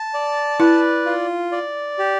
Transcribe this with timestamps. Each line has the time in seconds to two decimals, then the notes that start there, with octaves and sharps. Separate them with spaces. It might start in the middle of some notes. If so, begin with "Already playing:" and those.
Already playing: A5
0.14 D5
0.60 E4 B4
1.06 F4
1.52 D5
1.99 G4